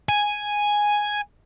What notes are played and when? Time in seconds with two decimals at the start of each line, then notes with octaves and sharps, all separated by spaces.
0.09 G#5